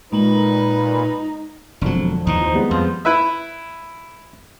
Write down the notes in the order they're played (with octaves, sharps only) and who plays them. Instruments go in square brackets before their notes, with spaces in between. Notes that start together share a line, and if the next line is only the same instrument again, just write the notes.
[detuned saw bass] A#2 [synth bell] G#3 A#5 F#7 [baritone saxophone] D#4 [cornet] B4
[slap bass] E1 F#3 [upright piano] F2 D3
[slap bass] D#2 E3 [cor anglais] D#4
[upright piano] F3 C5
G3 G#3 B3
[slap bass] F2 [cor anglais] F3
[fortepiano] E4 B4 E5